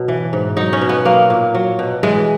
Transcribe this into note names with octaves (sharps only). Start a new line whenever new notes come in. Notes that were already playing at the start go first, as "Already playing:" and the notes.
Already playing: B2 F#3
E3
G#2
F#3 D#4
C#4
B2
B3
F#3 A#3
A#2
F#3
B2
E3 G#3